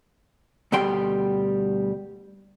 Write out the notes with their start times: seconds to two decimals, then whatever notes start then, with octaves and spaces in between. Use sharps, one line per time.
0.72 D2 B2 G3 G5 C6